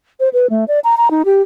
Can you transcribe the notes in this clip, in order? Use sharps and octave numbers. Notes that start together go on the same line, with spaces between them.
C5
B4
A3
D5
A#5
A#5
D#4
G4